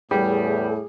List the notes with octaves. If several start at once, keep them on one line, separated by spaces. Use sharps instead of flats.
E2 A2 G3 G#4